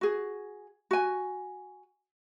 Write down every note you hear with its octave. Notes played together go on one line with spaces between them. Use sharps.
F#4 G#4
F#4 G#5